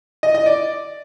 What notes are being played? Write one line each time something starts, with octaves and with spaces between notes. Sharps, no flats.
D#5
D#5
D5